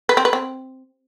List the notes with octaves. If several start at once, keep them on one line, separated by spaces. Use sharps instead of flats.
B4
C4
B4
C4